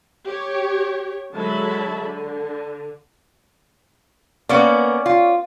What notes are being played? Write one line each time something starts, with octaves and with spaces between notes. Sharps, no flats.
G4 C#5
D3 F#3 G#3 E5 A5 B5
D3
A#3 B3 C#4 D5
F4